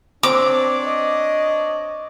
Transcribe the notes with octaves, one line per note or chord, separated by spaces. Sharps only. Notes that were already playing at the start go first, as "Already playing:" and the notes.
C4 D4 C#5 D5 D6
D#5